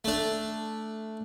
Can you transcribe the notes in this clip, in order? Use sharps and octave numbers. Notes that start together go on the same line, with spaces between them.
A3 D4